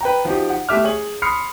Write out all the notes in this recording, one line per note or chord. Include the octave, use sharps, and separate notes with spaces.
B4 G5 A#5
F3 D#4 F#4 G4
F#5
A3 G4 E5 D6 F6
G#4 C#5 F#7
B5 C6 D#6 F6 C7 C#7